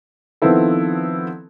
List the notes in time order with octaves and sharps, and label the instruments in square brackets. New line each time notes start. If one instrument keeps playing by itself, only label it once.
[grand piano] D#3 F3 B3 C4 E4 A4